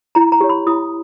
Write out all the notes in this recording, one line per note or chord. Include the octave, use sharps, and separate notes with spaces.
E4 A#5
A#5
G4 C#5
B5
E4 D#6